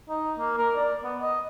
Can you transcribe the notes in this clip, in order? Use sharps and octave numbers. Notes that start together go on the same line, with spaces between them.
D#4
A#3
A#4
D5
B3
D#5